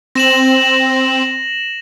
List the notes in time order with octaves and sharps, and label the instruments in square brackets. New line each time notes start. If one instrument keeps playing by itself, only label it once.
[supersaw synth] C4 [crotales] A#6 E7 F#7